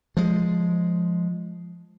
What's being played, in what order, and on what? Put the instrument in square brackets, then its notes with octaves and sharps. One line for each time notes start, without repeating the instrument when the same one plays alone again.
[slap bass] F3 G#3